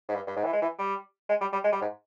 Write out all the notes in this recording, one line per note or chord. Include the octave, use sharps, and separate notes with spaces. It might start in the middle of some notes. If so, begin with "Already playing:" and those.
G#2
G2
G2
G#2
E3
G#3
E3
G3
G#3
G3
G3
G#3
G3
G#2